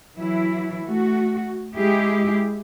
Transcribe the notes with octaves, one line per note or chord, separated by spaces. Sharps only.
E3 F#3 E4
A3 F#4
G#3 E4 G4 G#4